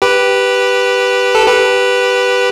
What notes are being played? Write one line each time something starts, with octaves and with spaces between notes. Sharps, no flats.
G4 B4
A4
G4 B4